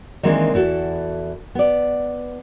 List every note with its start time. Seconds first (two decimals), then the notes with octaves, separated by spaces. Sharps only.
0.23 D#3 E3 G#3 A#3 C4 D4
0.54 E2 E4 F#4 A4
1.55 B3 D5